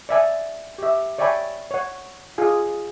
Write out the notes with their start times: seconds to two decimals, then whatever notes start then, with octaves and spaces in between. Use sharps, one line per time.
0.09 D5 E5 G#5
0.78 G4 E5
1.18 C#5 D5 E5 G5 G#5 B5
1.71 C#5 F#5
2.38 F4 G#4 G#5